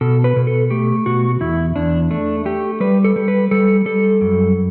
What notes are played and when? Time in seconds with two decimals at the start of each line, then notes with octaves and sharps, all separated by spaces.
0.01 B2 A4
0.24 B4
0.36 B2
0.47 A4
0.70 A3 G4
1.06 B2 F#4
1.41 E2 E4
1.76 E2 D4
2.11 A3 D4
2.45 A3 G4
2.80 G3 B4
3.04 A4
3.16 G3
3.28 B4
3.51 G3 A4
3.85 G3 A4
4.21 F#2